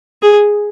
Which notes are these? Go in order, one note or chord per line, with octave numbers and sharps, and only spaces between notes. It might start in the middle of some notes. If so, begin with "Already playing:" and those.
G#4